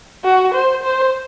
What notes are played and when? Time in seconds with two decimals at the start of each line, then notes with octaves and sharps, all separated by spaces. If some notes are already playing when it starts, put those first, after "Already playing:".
0.24 F#4
0.54 C5
0.83 C5